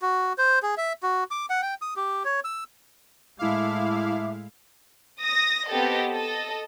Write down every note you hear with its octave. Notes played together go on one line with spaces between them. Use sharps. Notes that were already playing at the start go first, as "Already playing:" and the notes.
F#4
C5
G#4
E5
F#4
D6
F#5
G5
D#6
G4
C#5
E6
A2 G#3 E4 A4 E5 F5 D6
D#6 A#6
B3 C4 G4 A4 D#5
A4 D#5